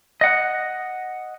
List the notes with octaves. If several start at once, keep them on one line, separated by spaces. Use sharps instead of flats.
D#5 F#5